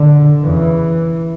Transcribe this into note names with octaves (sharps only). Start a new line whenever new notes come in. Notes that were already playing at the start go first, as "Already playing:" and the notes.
Already playing: D3
E2 C#3 E3